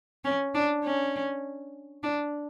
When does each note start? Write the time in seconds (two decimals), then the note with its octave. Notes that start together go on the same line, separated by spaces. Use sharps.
0.25 C#4
0.55 D4
0.85 C#4
2.03 D4